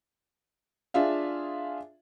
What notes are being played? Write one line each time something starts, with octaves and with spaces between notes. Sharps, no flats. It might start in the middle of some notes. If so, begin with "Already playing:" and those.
D4 F4 G#4 E5 F5